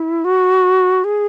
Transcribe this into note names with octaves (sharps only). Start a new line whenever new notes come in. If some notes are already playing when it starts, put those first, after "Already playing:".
Already playing: E4
F#4
G#4